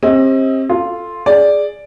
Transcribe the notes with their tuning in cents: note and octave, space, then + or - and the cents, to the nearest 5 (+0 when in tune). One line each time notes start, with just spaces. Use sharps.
C4 +35 G4 +20 D#5 +35
F4 +0 A4 +0
G#4 +0 D5 +0